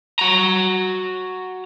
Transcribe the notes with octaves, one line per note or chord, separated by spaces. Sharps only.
F#4 A#5